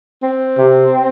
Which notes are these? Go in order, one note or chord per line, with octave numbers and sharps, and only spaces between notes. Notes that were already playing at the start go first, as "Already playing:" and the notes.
C4
C3